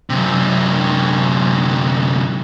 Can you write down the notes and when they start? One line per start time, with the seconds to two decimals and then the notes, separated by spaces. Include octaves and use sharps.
0.10 F#2 C3